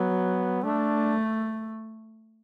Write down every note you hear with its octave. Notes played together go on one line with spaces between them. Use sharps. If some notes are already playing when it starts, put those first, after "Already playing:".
Already playing: F#3 B3
A3 D4